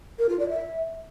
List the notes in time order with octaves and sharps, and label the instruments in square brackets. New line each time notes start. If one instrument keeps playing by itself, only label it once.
[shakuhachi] A#4
F4
D5
E5